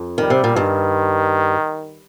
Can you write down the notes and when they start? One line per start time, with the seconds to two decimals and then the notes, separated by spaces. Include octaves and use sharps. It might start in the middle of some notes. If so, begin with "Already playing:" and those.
Already playing: F2
0.18 D#3 G3
0.30 C3
0.44 A#2
0.56 G2 D#3